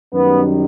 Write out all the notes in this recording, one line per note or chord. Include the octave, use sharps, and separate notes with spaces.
F#2 D#3 G3 B3